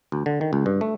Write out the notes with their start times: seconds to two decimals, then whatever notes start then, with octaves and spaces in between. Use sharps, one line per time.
0.12 D2
0.26 D3
0.41 D#3
0.53 C#2
0.66 G2
0.81 A3